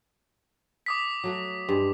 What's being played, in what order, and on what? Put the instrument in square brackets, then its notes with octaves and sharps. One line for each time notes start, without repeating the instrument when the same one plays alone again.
[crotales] D6 D#6 B6
[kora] F#3 A3 F#4
[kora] G2 G#3 [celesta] G4